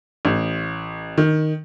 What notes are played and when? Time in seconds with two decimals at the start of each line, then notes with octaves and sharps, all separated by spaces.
0.25 A1
1.18 D#3